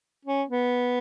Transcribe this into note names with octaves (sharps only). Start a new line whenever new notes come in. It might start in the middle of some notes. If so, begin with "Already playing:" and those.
C#4
B3